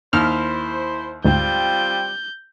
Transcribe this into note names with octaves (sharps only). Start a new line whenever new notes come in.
D#2 E4 C5 F6
D2 G#2 G3 C4 F4 G6